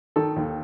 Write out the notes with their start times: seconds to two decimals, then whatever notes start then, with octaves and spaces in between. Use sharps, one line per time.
0.16 D#3 A4
0.36 D#2